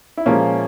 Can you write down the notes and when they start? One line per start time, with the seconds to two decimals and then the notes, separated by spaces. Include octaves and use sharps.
0.17 E4
0.26 A#2 F3 G#3 A#3 C#4